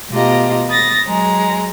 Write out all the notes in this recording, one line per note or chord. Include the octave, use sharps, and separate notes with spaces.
B2 A3 F4 G4 D#5 A#5
B5 D#6 A6 A#6
F#3 G#3 A#5